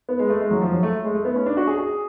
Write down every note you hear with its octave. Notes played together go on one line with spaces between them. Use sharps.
B3
G#3
A3
G#3
F#3
F3
F#3
A3
G#3
A3
B3
C#4
D4
F#4
G#4
G#4